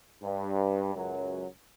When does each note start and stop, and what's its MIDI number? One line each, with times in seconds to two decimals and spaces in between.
0.23 0.94 43
0.95 1.45 37
0.95 1.45 42
0.95 1.45 54